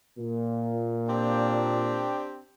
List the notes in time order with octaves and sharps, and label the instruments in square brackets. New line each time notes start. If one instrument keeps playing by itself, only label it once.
[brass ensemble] A#2
[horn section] C4 D4 G4